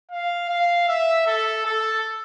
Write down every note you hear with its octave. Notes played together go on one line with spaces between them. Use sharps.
F5
F5
E5
A4
A4